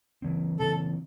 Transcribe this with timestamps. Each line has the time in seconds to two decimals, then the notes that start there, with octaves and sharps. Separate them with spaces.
0.22 C#3 E3 C4
0.59 C#3 E3 C4 A4